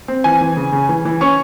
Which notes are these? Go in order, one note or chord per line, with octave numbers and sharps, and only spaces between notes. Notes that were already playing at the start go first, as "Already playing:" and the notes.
C4
E3 G#5
E3
C#3
C#3
E3
E3
C#4 C#6